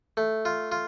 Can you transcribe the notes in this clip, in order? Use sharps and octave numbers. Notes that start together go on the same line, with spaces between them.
A3
F4
F4